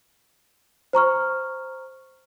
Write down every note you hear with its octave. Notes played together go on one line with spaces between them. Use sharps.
C5 A#5 C#6 F6